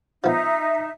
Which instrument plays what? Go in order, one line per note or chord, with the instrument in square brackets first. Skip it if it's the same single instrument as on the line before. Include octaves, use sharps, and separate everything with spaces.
[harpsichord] F3 B3 [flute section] D#4 E5